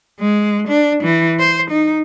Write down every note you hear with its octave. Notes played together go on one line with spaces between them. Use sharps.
G#3
D4
E3
C5
D#4